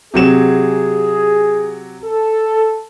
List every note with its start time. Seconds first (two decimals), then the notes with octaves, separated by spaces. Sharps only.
0.14 C3 F#3 G#4 E7
2.05 A4